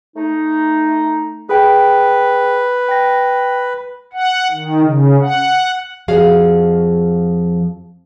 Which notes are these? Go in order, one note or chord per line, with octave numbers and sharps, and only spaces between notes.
A3 D#4
G#4 B4 G5
G5 A#6
F#5
D#3
C#3
F#5
F2 F3 F#4 G#4 F5